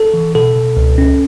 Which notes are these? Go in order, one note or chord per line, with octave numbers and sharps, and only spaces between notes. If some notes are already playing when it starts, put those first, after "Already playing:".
Already playing: A4
E3
B2 A4
B2
C#2
C#4